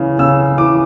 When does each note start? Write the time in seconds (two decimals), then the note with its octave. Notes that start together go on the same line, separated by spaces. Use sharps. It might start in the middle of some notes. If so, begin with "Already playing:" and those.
Already playing: C#3 E3
0.19 C#3 E6
0.58 E3 D6